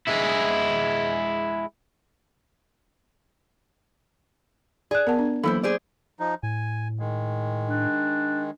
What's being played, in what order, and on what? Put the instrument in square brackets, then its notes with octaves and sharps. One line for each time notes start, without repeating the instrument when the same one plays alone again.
[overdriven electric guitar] G#3 E4
[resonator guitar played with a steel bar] G#4 [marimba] D5 F#6
[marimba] B3 [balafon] A#4 F#5 A5
[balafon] D4
[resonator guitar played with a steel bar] E3 E4 C5 [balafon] F#3 A#3 A4
[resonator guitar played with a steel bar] G#4 C5 D5
[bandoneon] F3 D#4
[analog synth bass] A2 [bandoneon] G#5
[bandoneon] D#3 G#3
[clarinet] D4